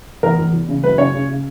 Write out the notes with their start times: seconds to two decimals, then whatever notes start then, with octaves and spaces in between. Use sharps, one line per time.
0.23 E2 A#4
0.38 E2
0.53 E2
0.69 C#3
0.84 F#2 B4
0.98 C#3 C#5
1.14 C#3
1.29 C#3